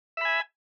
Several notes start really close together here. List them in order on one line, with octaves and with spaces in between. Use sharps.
E5 B5 G#5